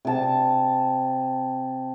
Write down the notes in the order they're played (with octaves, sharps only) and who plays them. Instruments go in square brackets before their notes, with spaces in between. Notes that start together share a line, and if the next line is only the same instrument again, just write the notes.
[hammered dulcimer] C3 A5